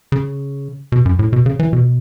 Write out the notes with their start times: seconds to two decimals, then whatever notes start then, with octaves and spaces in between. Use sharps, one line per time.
0.12 C#3
0.92 B2
1.05 F#2
1.19 A2
1.33 B2
1.46 C#3
1.59 E3
1.73 B2